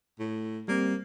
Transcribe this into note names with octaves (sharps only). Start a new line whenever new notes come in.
A2
G3 A#3 C4